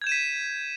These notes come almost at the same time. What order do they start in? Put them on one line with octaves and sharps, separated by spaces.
G#6 G6 E7 D#7 B6